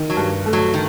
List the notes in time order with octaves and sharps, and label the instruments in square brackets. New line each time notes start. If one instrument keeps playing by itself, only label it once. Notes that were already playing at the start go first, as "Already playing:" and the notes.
Already playing: [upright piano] D#3
[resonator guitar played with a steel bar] F#3
[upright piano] G2
A3
[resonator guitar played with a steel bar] F#3
D#3